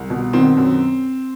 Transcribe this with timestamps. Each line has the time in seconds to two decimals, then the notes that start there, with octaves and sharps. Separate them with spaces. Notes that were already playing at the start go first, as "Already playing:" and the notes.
Already playing: C2
0.10 B2
0.33 D#3 C4
0.57 F#2